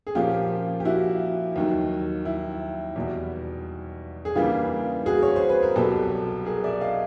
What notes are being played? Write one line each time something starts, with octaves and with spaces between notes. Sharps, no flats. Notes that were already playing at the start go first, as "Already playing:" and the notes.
G#4
A#2 F3 A#3 C#4 F4 G4
G4
E4 F#4
D#2 D#3 F#3
E4
E2 B2 G3
G#4
C#3 E3 G3 A#3 D4 F4 G4
F#4 G#4
C#5
C5
B4
A#4
C2 B2 F#3 G4 A4
G#4 A#4
D5 E5
D#5 F5